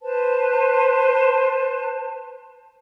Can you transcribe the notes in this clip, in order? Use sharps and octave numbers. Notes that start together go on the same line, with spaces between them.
B4 C5 A5